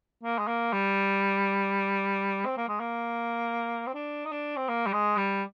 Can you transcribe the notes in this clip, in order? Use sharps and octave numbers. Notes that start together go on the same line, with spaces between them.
A#3
G#3
A#3
G3
C4
A#3
G#3
A#3
C4
D4
D#4
D4
C4
A#3
G3
G#3
G3